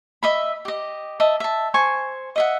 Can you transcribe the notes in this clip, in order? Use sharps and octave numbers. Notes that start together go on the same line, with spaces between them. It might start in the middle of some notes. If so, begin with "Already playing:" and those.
D#5 E5 B5
G4 D#5
D#5 E5 A5
E5 A5
C5 G#5 C#6
D#5 E5 F#5